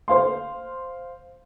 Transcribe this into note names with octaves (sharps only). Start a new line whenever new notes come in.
C5 F5 C6